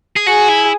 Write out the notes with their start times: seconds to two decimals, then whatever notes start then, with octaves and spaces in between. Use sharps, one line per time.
0.17 G#4
0.27 F#4 G#4
0.49 E4